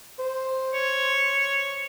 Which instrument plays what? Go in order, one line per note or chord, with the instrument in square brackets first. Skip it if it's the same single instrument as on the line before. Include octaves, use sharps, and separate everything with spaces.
[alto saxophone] C5
[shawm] C#5